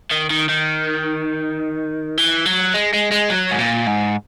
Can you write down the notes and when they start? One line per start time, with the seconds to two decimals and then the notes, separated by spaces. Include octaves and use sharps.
0.11 D#3
0.30 D#3
0.49 D#3
2.17 E3
2.46 F#3
2.74 G#3
2.93 G#3
3.11 G#3
3.30 F#3
3.51 G#2
3.59 A#2
3.87 G#2